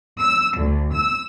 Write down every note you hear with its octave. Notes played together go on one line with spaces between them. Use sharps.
E6
D2
E6